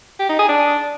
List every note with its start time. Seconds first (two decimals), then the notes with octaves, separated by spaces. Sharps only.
0.19 G4
0.29 D#4
0.39 G#4
0.49 D4